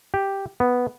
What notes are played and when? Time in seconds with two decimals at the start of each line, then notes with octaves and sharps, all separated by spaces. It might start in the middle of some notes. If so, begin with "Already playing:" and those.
0.14 G4
0.60 B3